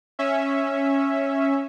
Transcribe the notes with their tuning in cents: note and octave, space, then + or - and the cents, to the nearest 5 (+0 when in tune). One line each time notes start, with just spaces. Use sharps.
C#4 -5 E5 +0